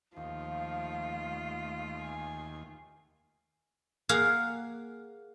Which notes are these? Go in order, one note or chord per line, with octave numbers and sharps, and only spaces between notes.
D#2 F3 A3 F4 F5
G#5
A#3 G#4 A#4 F5 F#5